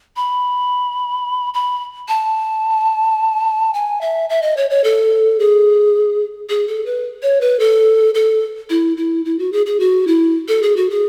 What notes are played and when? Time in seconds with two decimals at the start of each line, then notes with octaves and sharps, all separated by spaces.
0.16 B5
1.54 B5
2.08 A5
3.74 G#5
4.01 E5
4.30 E5
4.42 D#5
4.57 C#5
4.70 C#5
4.84 A4
5.39 G#4
6.49 G#4
6.68 A4
6.86 B4
7.23 C#5
7.41 B4
7.59 A4
8.15 A4
8.70 E4
8.97 E4
9.25 E4
9.39 F#4
9.52 G#4
9.66 G#4
9.80 F#4
10.07 E4
10.48 A4
10.63 G#4
10.76 F#4
10.90 G#4